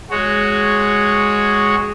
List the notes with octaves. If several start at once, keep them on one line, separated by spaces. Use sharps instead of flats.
G#3 F#4 C#5